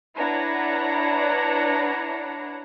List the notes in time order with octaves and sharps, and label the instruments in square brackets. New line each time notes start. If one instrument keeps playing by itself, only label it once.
[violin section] D4 E4 B4 C#5 F#5 A#5